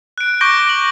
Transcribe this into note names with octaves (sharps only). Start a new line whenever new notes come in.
F#6 D7
C#6 D6 G6 A#6 D7 G7
F#7